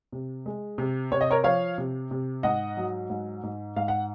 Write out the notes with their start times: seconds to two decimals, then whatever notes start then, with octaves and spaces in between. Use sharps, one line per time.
0.12 C3
0.46 G#3
0.78 C3
1.12 C3 C#5
1.21 D#5
1.30 A#4 C#5
1.44 F3 C#5 F5
1.78 C3
2.11 C3
2.43 G#2 D#5 F#5
2.77 F#3
3.10 G#2
3.43 G#2
3.76 G#2 F5
3.88 F#5